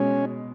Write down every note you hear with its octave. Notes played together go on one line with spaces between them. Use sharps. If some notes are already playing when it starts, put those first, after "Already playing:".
Already playing: B2 G#3 C#4